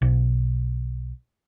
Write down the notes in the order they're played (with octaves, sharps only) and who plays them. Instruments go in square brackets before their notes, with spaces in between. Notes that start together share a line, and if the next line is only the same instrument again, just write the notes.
[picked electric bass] B1